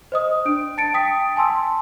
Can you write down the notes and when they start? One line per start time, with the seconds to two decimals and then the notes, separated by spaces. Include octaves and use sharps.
0.12 C5 D#5 D#6
0.45 D4 D7
0.78 A5 A6 C#7 D7
0.94 G5 D#6 B6 D7
1.36 G#5 A5 C6 E6